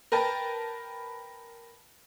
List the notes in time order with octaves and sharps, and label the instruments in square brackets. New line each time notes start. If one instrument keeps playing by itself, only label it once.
[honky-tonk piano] A#4 B4 G5 A5